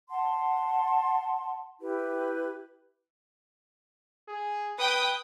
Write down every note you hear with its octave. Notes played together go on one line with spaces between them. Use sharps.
F#5 A5 C6
E4 G4 B4
G#4
B4 G5 D#6